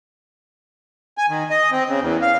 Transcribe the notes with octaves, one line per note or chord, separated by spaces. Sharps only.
G#5
D#3
D#5
C4
C#3
E2
F5